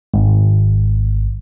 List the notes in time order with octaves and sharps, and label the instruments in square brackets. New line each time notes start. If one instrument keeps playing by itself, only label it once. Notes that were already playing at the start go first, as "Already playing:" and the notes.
[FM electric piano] G#1